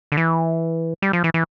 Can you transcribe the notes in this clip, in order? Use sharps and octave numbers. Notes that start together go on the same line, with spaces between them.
D3
E3
G3
F3
E3
E3